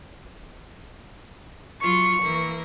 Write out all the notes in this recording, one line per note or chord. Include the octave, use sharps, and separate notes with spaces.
F#3 F4 C#6
E3 A#3